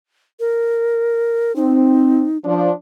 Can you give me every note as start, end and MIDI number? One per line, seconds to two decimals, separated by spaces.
0.40 1.55 70
1.56 2.23 60
1.56 2.37 63
2.45 2.70 53
2.45 2.70 62